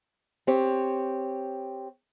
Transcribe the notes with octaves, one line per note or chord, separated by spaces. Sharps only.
C4 G4 C#5